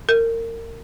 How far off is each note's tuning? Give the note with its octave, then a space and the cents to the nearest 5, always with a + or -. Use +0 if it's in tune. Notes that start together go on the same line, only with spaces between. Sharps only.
A#4 -30